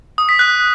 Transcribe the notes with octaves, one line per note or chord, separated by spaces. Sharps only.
D#6
B6
F#6